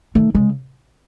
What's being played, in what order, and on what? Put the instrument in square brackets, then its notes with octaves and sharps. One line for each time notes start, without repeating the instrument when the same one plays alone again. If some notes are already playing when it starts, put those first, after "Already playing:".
[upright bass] D#3 [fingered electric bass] A3
[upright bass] C#3 [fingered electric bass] G#3